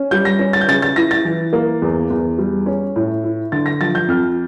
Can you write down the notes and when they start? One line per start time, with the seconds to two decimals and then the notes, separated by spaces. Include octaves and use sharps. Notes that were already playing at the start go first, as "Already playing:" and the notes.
Already playing: C#4
0.11 G3 G6
0.25 A#6
0.39 C#4
0.53 A6
0.61 G6
0.68 C#3 A6
0.82 A6
0.96 E4 A#6
1.11 A6
1.25 E3
1.53 A#3
1.82 E2
2.10 E2
2.38 G3
2.66 C#4
2.96 A2
3.24 E4
3.52 D3 A6
3.66 A#6
3.81 F3 A6
3.95 G6
4.08 F2 F6